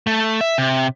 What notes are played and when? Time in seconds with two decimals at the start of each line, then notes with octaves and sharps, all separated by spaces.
0.07 A3
0.41 E5
0.58 C3